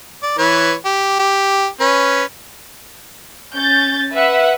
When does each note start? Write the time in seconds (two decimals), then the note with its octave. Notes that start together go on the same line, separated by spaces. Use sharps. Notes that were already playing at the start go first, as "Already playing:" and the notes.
0.23 D5
0.38 E3 B4 C#5
0.85 G4
1.20 G4
1.81 C#4 B4
3.53 C#4 G6 A6
4.12 B4 E5 F#5